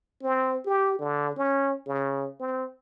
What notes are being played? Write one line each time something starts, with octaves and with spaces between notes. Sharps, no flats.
C4
G4
D3
C#4
C#3
C4